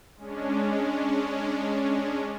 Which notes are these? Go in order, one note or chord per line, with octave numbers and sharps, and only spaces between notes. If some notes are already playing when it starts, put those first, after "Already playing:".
G#3 C#4 D4